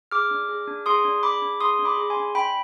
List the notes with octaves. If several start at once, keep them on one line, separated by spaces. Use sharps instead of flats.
G#4 D6 F6
D4
G#4
D4
G#4 C6 D#6
D4
G#4 B5 D6
D4
G#4 C6 D#6
D4
B5 D6
G#4
G#5 C6
D4
D4 G5 B5